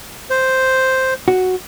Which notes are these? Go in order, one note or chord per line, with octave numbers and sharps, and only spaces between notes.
C5
F#4